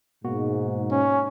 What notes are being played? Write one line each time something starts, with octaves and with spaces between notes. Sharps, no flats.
G#2 B2 A#3 F#4
C#4